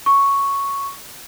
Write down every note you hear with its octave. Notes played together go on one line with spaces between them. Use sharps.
C#6